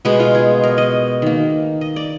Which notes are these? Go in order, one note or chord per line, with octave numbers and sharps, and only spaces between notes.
B2 G#3 B3
F4
G#4
A#4
D#5
D#3 A#3
D#5
D5